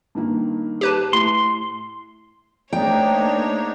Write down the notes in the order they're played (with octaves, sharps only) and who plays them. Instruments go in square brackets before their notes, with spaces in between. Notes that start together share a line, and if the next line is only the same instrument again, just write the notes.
[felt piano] G2 D#3 A#3
[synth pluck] G4 B4 A5
[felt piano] A2 [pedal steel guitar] C6
[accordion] G#2 D4 D#4 [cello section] A3 A#3 [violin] C#5 [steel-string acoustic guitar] G5